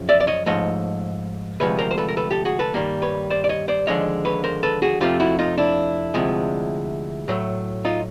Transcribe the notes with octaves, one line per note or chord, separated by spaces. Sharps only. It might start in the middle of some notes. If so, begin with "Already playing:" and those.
Already playing: F#2 C#3 F3
D5 E5
D5
C#5 D#5
G#2 F3 A3 C#5 D#5
D2 C3 F3 G#3 B4 C#5
A#4 C5
C5
A4 B4
A#4
A4 B4
G4 A4
F#4 G#4
A4 B4
G2 D#3 G3 A#3
B4 C#5
C5 D5
D5
C#5 D#5
C5 D5
D#2 D3 F3 G#3 C#5 D#5
B4 C#5
A#4 C5
A4 B4
F#4 G#4
F2 C3 F3 A3 F4 G4
E4 F#4
D#4 F4
D4 E4
D2 C3 F3 G#3
A2 F#3 A3
D#4 F4